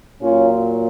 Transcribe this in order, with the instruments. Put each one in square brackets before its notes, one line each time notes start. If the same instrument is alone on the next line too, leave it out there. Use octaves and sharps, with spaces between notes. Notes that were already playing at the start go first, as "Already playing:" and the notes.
[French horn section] A#2 F#3 C#4 F4